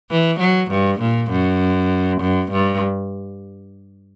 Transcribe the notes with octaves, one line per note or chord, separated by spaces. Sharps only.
E3
F#3
G2
A#2
F#2
F#2
G2